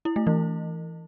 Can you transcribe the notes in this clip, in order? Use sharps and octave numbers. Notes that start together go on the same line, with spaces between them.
E4
A3
E3